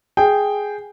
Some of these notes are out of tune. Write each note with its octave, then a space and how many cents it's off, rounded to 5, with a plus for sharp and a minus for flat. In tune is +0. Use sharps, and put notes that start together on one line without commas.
G#4 +0 G5 +0